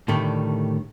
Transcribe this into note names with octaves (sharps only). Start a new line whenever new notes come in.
A2 D3 D#3 G3 A3